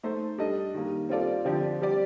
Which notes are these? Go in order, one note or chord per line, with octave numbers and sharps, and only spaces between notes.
A3 D#4 A4 C5
G3 D4 A4 D#5
D#3 G3 A#3
G3 C4 F4 A4 D5
D3 F3 C4 G4 D5
G3 C4 G4 D5